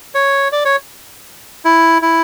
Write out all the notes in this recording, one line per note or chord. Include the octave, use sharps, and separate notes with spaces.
C#5
D5
C#5
E4
E4